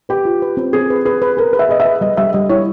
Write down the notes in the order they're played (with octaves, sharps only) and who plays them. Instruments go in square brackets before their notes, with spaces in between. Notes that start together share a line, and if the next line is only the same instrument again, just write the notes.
[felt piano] G4 [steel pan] B4
[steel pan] F4
B4
C4
[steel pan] C4 [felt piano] G#4
[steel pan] B4
[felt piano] G#4 [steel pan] B4
[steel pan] B4
[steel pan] G#4 [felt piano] A#4
[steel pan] B4
[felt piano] E5
[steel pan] G#4 [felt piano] D#5
[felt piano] E5
[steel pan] B4
[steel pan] G3 [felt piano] D#5
[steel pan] G3 [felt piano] E5
[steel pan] G3 [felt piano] D#5
[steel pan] E4 [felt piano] C#5